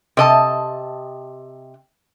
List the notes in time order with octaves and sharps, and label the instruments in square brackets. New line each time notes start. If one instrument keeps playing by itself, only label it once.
[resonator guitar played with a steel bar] C3 D#5 A5